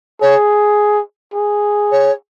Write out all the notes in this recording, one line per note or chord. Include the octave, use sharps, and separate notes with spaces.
G#4 C#5
G#4
C#5